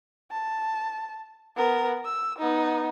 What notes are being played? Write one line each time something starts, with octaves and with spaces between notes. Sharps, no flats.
A5
B3 A#4
E6
B3 D#4